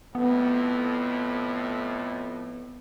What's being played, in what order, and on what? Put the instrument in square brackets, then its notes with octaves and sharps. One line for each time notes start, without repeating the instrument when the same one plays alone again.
[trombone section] F2 A2 [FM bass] B3